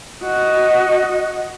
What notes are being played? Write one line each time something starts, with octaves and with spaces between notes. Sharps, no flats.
F#4 D#5